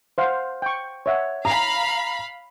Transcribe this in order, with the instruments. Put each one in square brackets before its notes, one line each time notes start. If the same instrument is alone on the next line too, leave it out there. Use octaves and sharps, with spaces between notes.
[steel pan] C5 F5 F#5
G5 C#6
C#5 E5 F#5
[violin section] F5 B5 [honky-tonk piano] A#5